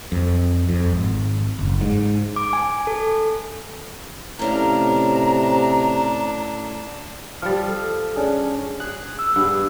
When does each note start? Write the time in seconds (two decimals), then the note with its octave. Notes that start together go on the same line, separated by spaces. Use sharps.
0.12 F2
0.69 F2
0.92 G#1
1.59 F#1
1.81 G#2
2.36 D6
2.53 G#5
2.87 A4
4.39 A2 C3 C#4 D4 F5 A#5
7.42 F3 G3 F6 A6
7.69 A4
8.16 C#4 D4 G#4
8.80 G#4 F#6
9.19 E6
9.36 G2 B3 G#4